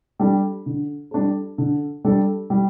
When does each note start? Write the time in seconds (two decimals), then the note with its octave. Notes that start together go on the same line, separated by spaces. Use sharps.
0.19 G3 D4 A4
0.66 D3
1.11 G3 D4 A4
1.58 D3
2.04 G3 D4 A4
2.50 G3